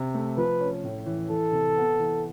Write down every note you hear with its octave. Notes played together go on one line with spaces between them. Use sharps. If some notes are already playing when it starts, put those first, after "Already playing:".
Already playing: C3
A3
F3 B4
C#4
A2
E3
E3 A4
C3
B3
E3